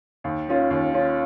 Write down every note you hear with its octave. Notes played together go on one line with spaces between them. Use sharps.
D#2
D#3 C#4 F4
D#2
D#3 C#4 F4